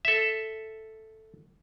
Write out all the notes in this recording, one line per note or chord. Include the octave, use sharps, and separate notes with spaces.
A4 E5